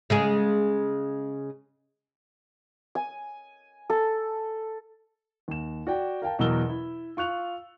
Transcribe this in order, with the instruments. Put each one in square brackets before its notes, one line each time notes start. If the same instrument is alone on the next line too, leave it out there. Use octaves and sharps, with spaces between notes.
[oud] C#3 G#3 G#4
[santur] G#5
A4
[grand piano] D#2 E7
F#4 D5 G5
A#4 F5 G5 A5
E2 B2 F#3 A#4 E6 G7
E4
F4 C#6 F#6 F7